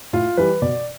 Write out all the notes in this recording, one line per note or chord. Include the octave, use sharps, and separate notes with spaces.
A2 F4
E3 G3 B4
B2 D5